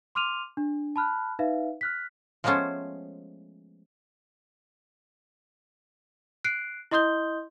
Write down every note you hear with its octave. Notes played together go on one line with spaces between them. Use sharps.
C6 D6 F6 D#7 F7
D4
A5 B5 F6 F#6
D#4 B4 E5 F5
F6 F#6 B6
F3 G#3 A3 B3 C#4 C5
F#6 C7 D7
E4 D#5 C6 D#6 G6 G7